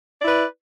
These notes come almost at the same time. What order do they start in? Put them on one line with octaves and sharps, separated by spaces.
D5 E4 B4